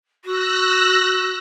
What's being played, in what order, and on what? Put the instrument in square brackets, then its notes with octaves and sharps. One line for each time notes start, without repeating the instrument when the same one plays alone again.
[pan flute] F#4 [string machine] E6 F#6 A#6